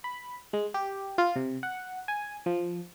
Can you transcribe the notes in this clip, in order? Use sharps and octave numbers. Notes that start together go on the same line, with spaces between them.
B5
G#3
G4
F4
C3
F#5
G#5
F3